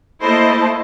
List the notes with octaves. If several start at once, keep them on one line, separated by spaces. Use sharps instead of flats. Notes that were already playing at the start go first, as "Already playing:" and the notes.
A3 A#3 E4 C5 D#5 A5